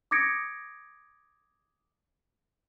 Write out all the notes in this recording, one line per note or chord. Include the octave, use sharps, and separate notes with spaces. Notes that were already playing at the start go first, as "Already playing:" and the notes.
D6 D#6 G#6 A#6 C#7 D7